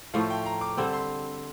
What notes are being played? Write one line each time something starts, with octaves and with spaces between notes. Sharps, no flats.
A2 F3 A3 F5
G5
A#5
D6
D3 G3 C4 E6
C6